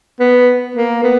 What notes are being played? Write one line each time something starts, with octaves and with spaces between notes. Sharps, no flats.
B3
A#3
B3